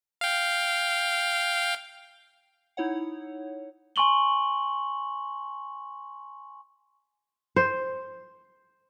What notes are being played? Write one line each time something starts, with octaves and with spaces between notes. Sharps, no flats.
F5 G5
D#4 E4 C#5 F#5
G#5 C6 C#6 F#7 G7
C5